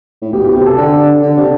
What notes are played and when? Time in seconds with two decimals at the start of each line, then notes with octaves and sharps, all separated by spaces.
0.22 A2
0.33 B2 G4
0.44 G4
0.55 C3 G4
0.66 A4
0.78 D3
1.22 D3
1.37 C3